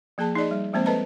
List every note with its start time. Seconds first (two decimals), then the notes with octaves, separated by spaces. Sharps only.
0.18 F3 A#3 G#4 A5
0.35 D#4 G#4 D5 D#5
0.51 G3
0.73 F3 G#3 A#3 C4 C5
0.86 A4 B4 C5 D#5 A5 A#5